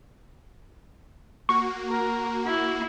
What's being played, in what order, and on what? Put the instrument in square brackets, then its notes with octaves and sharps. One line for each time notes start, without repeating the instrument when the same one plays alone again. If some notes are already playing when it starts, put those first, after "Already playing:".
[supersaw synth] A#3 F#4 [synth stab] C#6
[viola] A#4
E4